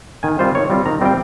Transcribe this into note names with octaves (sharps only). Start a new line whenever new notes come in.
D#3 G#5
G3 C4 F4 C5
D#3 C#5
G3 C4 F4
D#3 A#5
G3 C4 F4 G5